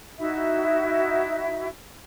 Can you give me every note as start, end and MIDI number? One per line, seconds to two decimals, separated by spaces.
0.18 1.67 63
0.18 1.67 64
0.18 1.67 66
0.18 1.67 76